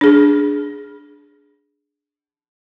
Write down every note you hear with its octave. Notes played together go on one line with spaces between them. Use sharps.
D4 G#4